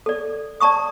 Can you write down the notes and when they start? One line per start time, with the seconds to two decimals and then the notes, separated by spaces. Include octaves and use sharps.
0.06 A4 D5
0.60 D5 A5 A#5 C#6 D#6